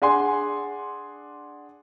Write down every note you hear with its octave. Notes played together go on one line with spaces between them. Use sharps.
D4 G#4 F#5 G#5 C6